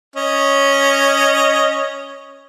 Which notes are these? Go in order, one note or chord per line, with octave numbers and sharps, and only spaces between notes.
C#4 D#5